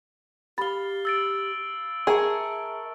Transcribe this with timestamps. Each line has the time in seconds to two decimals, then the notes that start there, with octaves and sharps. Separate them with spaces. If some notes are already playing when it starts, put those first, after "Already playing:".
0.58 G4 F5 B5 A6 G7
1.05 E6 A6 D7
2.07 G#4 A#4 E5 A5 C#6